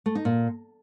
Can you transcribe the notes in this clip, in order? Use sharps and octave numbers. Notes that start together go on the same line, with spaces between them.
A3
D#4
A#2